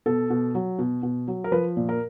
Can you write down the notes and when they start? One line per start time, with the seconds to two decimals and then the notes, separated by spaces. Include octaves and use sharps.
0.06 B2 A4
0.30 B2
0.55 F#3
0.79 B2
1.03 B2
1.28 F#3
1.44 A#4
1.52 F3 B4
1.77 A#2
1.89 A#4